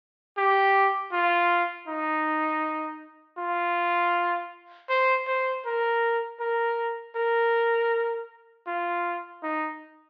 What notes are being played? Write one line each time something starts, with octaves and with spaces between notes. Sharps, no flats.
G4
F4
D#4
F4
C5
C5
A#4
A#4
A#4
F4
D#4